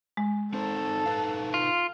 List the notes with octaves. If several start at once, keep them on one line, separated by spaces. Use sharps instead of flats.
G#3
C4 D#4 A4 C5
D#4 B4 F5
F4